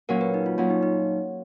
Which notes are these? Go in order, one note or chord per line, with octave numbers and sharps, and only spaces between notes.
A#2 F#3 C#4 A#4
B4
D#4
F4
A#2 F#3 C#4 F4
D#4
D#4